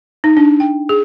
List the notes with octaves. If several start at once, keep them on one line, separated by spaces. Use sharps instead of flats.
D#4
D4
G5
G#4